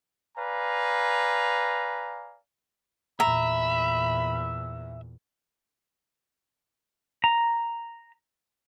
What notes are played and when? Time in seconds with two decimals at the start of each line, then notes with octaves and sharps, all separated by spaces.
0.37 B4 D5 F5 G#5 A#5
3.20 E2 A#2 E5 A#5 B5
7.24 A#5